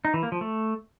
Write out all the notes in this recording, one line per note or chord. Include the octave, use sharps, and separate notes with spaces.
D#4
E3
A#3
F3
A3